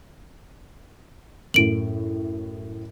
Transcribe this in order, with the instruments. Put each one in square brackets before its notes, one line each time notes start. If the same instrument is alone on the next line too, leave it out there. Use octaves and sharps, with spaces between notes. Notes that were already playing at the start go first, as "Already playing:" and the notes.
[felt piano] F#2 A2 [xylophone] D7 F#7